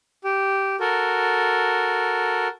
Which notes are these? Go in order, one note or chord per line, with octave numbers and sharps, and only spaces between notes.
G4
F#4 A4 A#4